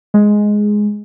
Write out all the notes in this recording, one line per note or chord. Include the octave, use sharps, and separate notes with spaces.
G#3